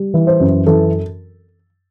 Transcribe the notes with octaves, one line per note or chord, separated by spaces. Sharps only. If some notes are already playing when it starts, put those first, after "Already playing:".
Already playing: G3
E3
C5
F#2
E3 A4